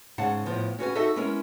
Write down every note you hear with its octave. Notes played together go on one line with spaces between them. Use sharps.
G#2 C#3 F#5 A5
A2 F3 B3
C#4 F#4 B4 G#5
D#4 F#4 A4 D#5 E5
G#3 B3 C#4 E4 A#4